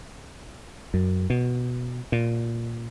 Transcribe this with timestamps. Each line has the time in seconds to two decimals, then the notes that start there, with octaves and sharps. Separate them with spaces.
0.94 F#2
1.30 B2
2.12 A#2